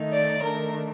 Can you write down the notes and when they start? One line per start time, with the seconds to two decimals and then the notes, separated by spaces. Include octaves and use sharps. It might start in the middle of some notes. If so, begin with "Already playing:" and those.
Already playing: D#3 A3 D#4
0.13 D5
0.42 D#3 A3 D4 A#4